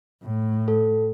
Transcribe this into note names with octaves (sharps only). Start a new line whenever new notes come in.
A2
A4